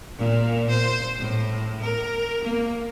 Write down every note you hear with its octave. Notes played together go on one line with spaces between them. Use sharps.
A#2
C5
A2
A#4
A#3